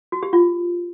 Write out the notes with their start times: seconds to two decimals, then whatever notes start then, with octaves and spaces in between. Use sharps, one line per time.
0.12 F#4
0.23 G4
0.33 F4